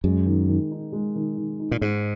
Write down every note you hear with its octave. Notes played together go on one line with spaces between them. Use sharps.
F#2 G#3
D#3
D#3
D#4
G#3
D#3
D#3
D#4
A#2
G#2 G#3